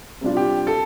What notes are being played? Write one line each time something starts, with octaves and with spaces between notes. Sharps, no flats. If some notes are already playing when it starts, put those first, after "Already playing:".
C3 G3 D4 F4
G4
A4